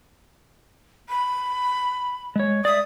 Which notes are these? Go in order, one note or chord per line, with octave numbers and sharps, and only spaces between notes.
B5
G#3 C#5
D5 E5 D#6